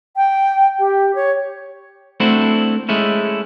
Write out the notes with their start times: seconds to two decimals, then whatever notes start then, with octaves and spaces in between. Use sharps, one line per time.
0.16 G5
0.79 G4
1.15 C#5
2.20 A3 C4 D4 E4 F#4 C5
2.89 G#3 A3 C#4 E4